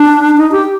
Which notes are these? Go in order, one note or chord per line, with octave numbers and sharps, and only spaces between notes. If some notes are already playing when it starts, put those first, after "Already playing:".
Already playing: D4
D#4
G4